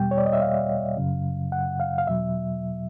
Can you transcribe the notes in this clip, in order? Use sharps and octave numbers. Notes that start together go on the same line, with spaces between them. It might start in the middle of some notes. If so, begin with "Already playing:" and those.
Already playing: E2 B2 G3 G5
C#5
D5
D#5
E5
F5
F#2 C#3 F#3
F#5
F5
F5
E2 B2 F#3 E5